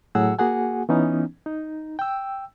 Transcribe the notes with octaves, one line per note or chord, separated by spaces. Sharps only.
A2 F#3 F#4 G#4 F#5 E6
A#3 F#4 G#4 F#5 G#5
E3 B3 C#4 D#4
D#4
G5 E6